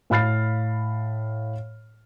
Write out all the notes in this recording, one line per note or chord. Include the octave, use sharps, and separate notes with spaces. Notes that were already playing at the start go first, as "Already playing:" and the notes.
A2 F5 B5 F6 A6 C7